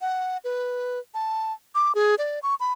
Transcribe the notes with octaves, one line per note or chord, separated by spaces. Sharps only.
F#5
B4
A5
D6
G#4
D5
C#6
B5